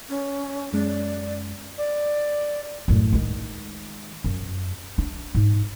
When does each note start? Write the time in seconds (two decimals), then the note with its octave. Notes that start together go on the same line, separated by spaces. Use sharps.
0.09 C#4
0.73 F#2 G#3 C#4 D5
1.78 D5
2.88 F#2 A2
3.13 D#3 G#3
4.24 F#2
4.98 D4
5.35 G#2